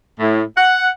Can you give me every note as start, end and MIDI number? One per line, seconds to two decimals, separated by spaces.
0.19 0.42 45
0.57 0.86 78